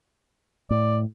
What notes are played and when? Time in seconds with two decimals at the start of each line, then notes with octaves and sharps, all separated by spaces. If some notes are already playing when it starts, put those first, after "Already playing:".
0.70 A2 D5